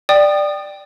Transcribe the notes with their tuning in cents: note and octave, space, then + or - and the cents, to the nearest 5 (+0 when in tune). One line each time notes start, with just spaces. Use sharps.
D5 +10 G5 +0 D#6 -30